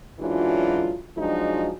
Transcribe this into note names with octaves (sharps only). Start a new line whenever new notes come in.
F#2 E3 F#3 G#3 D4 F4
F3 F#3 G#3 D4 D#4 F#4